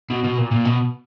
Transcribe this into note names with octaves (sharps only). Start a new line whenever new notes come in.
B2
B2
A#2
A#2
B2